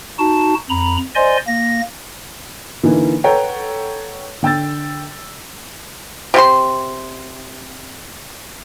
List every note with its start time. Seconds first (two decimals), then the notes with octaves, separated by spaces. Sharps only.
0.19 D#4 F#4 A5
0.70 F2 A#5 B5
1.15 C5 D5 D#5 G#5 C6
1.47 A#3 A#6
2.84 D3 E3 A#3 D#4
3.24 A4 B4 C#5 F#5 G5 A#5
4.43 D3 G5 E6 A6
6.34 C3 F4 C6